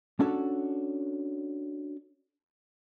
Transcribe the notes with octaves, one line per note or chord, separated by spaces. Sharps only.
C#4 D4 F#4 A4 C#5